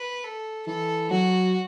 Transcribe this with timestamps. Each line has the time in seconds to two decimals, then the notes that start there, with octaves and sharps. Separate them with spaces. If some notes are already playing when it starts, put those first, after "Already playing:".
Already playing: B4
0.24 A4
0.66 E3 A4
1.10 F#3 F#4